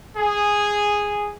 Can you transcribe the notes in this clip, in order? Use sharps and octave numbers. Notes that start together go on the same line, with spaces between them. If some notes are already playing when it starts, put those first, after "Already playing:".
G#4